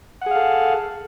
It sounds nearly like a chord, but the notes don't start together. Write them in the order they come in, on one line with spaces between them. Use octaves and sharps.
F#5 G#4 F5 A4